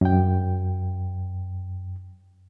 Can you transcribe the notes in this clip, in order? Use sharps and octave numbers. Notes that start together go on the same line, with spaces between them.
F#2 G5